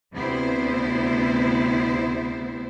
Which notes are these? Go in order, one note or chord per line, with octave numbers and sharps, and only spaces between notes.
D2 C3 B3 E4 C5